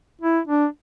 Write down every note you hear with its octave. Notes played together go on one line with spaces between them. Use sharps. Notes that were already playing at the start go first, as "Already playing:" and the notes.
E4
D4